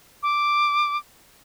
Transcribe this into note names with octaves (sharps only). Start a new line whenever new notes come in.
D6